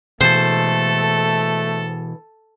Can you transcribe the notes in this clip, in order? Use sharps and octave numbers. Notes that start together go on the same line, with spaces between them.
B2 E3 A3 A4 C5